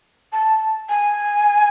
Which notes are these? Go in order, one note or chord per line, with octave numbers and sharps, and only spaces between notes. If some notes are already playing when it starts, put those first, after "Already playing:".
A5
G#5